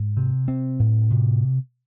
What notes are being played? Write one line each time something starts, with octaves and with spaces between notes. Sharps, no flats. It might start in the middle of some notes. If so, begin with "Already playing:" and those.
Already playing: G#2
C3
C4
A2
C3